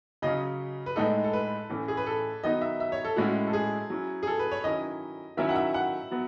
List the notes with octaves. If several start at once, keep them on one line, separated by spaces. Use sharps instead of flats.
C#3 F#3 C#4 D#5
B4
A2 G#3 D#4 A4
A4
B4
A2 E3 A3 C#4
G#4
B4
A4
D#3 F#3 B3 D#4 D#5
E5
E5
C#5
A4
A2 G#3 C#4 E4 F#4
A4
G#4
F#3 C#4 E4
G#4
A4
B4
C#5
D#3 F#3 C#4 E4 D#5
D#3 F#3 C#4 E4 E5
F#5
E5
F#5
F#3 B3